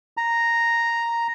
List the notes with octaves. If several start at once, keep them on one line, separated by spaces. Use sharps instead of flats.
A#5